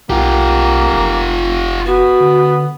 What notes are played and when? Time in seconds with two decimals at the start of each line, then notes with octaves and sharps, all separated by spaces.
0.10 B1 A#3 F4 G4
0.93 F#1
1.86 B3 F#4
2.21 D3